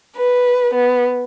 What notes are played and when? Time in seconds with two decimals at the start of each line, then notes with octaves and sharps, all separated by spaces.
0.16 B4
0.73 B3